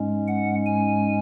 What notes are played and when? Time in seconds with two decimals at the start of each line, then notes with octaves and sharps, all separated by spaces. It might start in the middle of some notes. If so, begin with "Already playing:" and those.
Already playing: G#2 G#3 C#4
0.27 F#5
0.66 G#5